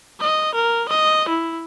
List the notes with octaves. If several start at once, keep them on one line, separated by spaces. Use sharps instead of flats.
D#5
A#4
D#5
E4